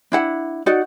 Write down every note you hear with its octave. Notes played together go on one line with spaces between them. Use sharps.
D4 E4 F#5
D#4 F#4 D5 F#5